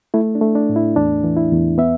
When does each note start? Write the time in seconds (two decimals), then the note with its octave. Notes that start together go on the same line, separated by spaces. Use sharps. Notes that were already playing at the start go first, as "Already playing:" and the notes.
0.14 A3 E4
0.35 D4
0.41 A3
0.55 D4
0.69 A2
0.76 E4
0.96 E2 D4
1.24 E3
1.37 E4
1.52 E2
1.78 B3 E5